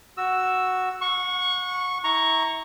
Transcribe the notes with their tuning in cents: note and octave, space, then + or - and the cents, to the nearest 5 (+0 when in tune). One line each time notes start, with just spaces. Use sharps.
F#4 +0 E6 +0
F#5 -35 C#6 -5
E4 -30 A#5 +0 C#6 +0